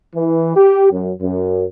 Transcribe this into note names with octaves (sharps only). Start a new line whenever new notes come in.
E3
G4
F#2
F#2